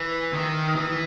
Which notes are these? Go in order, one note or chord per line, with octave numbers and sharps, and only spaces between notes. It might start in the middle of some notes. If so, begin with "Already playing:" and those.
Already playing: E3
D#3
E3